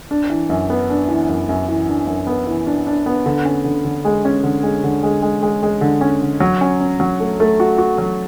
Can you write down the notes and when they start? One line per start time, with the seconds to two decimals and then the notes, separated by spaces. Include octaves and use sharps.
0.11 D4
0.30 E3
0.50 F#2
0.70 B3
0.90 D4
1.09 E3
1.29 F#2
1.49 F#2
1.69 E3
1.88 D4
2.07 F#2
2.27 B3
2.47 E3
2.67 D4
2.87 D4
3.06 B3
3.26 D3
3.45 C#4
3.65 D3
3.85 D3
4.05 G#3
4.25 C#4
4.43 D3
4.63 G#3
4.84 D3
5.03 G#3
5.22 G#3
5.43 G#3
5.63 G#3
5.81 D3
6.01 C#4
6.21 D3
6.40 F#3
6.61 C#4
6.80 C#4
7.00 F#3
7.20 A3
7.40 A3
7.60 F#4
7.78 F#4
7.98 F#3